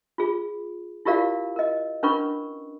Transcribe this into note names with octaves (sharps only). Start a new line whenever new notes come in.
F4 G#4
E4 F4 G4 A#4 D5 F5
A#4 D#5
C#4 D4 A#4 B4 B5 C#6